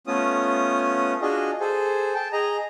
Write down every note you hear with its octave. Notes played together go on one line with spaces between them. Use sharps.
A3 B3 C#4 F4 D#6
D4 F4 F#4 G#4 D#5
G#4 A4 C5
G5 A5
G#4 D#5 A#5